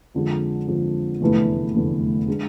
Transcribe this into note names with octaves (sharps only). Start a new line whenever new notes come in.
F2 D3 G#3
F2 D3 G#3
F1 E2 D3 A3 E4
F1 E2 D3 A3 E4
G#3 D4 G#4